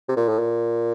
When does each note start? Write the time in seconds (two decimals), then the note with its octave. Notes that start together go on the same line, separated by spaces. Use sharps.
0.09 C3
0.17 A#2
0.28 A2
0.39 A#2